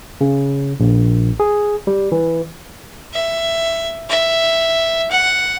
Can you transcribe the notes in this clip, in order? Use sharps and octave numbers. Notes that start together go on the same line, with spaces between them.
C#3
A#1
G#4
G3
E3
E5
E5
F#5